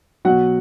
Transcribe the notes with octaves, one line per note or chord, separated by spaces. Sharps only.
B2 F#3 F#4 F#5